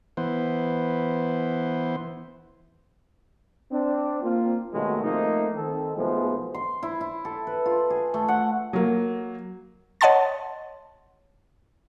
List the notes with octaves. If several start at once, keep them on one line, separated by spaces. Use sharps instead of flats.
E3 B3 C5
C4 D4
A#3 C4 F4
D#2 B2 D#3 F#3 G#3 A3
F3 A3 A#3 C4 D#4
D#3 C4 A4
B1 F3 G#3 A3 B3 C5
C6
E4
E4
A4
B4
F4
G#4
A3
F#5
F#3 A#3
C#5 D#5 F#5 A5 C6 A6